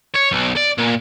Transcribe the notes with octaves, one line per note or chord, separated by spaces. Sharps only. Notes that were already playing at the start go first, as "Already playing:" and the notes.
C#5
B1
D5
A#2